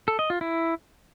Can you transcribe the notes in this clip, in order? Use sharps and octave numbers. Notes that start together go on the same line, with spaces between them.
A4
D#5
F4
E4